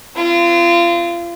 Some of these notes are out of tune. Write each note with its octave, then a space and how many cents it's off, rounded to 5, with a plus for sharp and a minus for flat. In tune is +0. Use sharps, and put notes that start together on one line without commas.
C4 -25 F4 -30